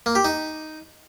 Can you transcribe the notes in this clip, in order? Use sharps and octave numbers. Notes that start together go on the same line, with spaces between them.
A#3
G4
D#4